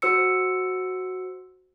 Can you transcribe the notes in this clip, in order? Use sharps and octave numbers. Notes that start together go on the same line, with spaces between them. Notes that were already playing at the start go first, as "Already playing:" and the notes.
F#4 C5 E6 C#7